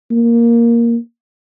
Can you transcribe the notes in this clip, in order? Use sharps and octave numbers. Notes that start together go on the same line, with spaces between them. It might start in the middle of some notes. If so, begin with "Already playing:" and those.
A#3